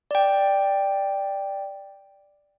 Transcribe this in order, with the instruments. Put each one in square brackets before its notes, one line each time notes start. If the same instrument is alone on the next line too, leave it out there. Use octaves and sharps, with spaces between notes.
[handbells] D5 G5